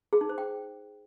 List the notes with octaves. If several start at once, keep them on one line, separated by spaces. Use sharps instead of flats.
G#4
D#4
C5
G5